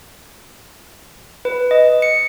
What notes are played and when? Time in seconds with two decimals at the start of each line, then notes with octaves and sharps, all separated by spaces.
1.45 B4
1.71 D#5
2.02 C#7